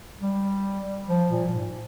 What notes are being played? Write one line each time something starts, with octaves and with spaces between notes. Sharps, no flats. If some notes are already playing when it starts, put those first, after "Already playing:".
G3
F3
A#2
G#2